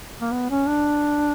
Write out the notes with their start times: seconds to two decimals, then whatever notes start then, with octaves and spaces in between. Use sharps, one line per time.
0.21 A#3
0.32 B3
0.50 C#4
0.67 D4